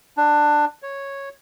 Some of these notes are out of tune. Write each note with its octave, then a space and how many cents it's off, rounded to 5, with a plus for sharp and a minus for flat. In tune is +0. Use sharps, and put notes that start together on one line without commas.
D4 +15
C#5 -5